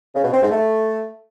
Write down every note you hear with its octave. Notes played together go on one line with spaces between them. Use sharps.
C#3
B2
C4
G#2
A3